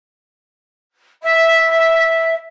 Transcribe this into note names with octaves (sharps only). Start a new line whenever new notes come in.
E5